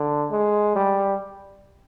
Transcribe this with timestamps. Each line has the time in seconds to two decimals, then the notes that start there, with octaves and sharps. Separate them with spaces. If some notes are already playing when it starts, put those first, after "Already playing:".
Already playing: D3
0.31 G#3
0.76 G3